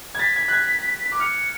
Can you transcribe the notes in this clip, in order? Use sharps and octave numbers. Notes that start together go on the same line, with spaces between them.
G#6
A6 B6
G#6
F#6
G#6
D6
F6 C#7